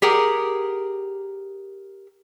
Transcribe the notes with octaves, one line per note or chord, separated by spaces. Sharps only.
G4 G#4 A#4 F#5